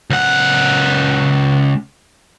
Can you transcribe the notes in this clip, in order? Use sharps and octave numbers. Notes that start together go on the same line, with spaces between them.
C#2 F#5